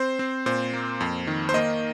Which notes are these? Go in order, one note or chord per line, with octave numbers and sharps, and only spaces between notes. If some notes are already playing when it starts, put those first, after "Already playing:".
Already playing: C4 C5
C4
A#2 C5
A#3
F2
D#3
C5
A#3 D#5